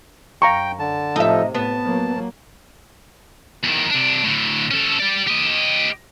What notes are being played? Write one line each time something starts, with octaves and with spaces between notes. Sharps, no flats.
F#2 F5 G5 A#5 C#6
D3 A5
A2 C3 F3 D#4 A4 E5
A2 B3 A5
F#3 A#3
E2 D#3
C3 D4
A2 D3
C#4 A4
G4 D5
G4 D#5